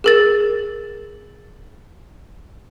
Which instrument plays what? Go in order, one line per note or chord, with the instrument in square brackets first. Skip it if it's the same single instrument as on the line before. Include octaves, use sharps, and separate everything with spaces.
[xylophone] G#4 A#4 A6